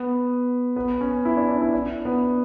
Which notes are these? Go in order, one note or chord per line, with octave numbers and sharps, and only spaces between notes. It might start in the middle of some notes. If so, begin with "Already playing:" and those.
Already playing: B3
B3
C#4
E4
D4
D4
E4
D4
B3